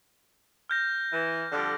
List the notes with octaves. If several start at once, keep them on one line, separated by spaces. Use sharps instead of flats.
F6 G6 A#6
E3
F2 D3 G3